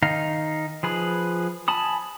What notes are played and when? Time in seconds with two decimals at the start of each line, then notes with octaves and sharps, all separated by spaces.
0.02 D#3 D#4 F5
0.83 F3 G#4 B4
1.68 G#5 A5 B5 D#6